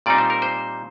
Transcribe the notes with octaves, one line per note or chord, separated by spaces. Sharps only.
A#2 G3 C4 D#4 D5
C5
A#4
C5